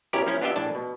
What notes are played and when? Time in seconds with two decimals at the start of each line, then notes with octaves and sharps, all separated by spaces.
0.13 B2 C#4 E4 G4 A#4 D5
0.26 F3 A#3 C#4 E4
0.42 B3 D4 F4 G4 D#5 E5
0.56 A#1 A2 D4 A5
0.75 B2